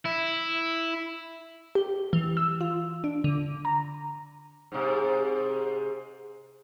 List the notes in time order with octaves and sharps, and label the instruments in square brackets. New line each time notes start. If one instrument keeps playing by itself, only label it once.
[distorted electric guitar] E4
[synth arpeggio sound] G4
E3
E6
F4
D4
D3
A#5
[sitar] G#2 C3